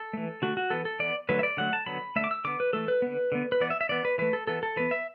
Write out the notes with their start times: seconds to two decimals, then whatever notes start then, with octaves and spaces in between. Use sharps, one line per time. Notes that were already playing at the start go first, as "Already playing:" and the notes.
Already playing: A4
0.13 E3 A3
0.42 D3 A3 F#4
0.57 F#4
0.70 E3 B3 A4
0.85 A4
0.99 E3 B3 D5
1.29 D3 F#3 A3 B4
1.39 E5
1.43 D5
1.57 D3 F#3 A3 F#5
1.73 A5
1.86 D3 F#3 B3 B5
2.16 D3 A3 E5
2.24 D6
2.31 E6
2.45 D3 B3 D6
2.60 B4
2.73 E3 A3 A4
2.88 B4
3.02 D3 B3
3.32 D3 B3
3.52 B4
3.60 E3 B3 D5
3.70 E5
3.81 E5
3.89 E3 B3 D5
4.05 B4
4.18 E3 A3 B4
4.33 A4
4.47 E3 B3 A4
4.63 A4
4.76 E3 B3 B4
4.91 E5